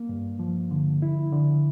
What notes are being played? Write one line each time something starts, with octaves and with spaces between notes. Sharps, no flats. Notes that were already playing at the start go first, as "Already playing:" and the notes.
Already playing: A#3
G2
F3
D3
E4
D3